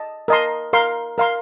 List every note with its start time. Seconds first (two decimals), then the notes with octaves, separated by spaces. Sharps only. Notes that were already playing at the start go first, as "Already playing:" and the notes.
Already playing: D#5 A5
0.28 A#4 D#5 A5 C6
0.73 A#4 F5 C6
1.18 A#4 F5 C6